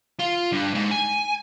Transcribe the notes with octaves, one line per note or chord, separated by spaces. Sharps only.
F4
G2
G#2
G#5